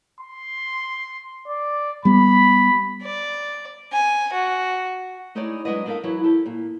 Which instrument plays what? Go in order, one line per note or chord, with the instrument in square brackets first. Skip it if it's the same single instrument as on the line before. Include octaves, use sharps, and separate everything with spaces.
[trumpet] C6
D5
[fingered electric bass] G3 B3 [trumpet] B5
[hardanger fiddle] D5
G#5
F#4
[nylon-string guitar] A3 D#4 E4 G#4 C#5 D5
F#3 G#3 D4 F#4 B4 D#5
D4 D#4 A4 A#4 E5 F5
E3 F#3 E4
G4 A4
A#2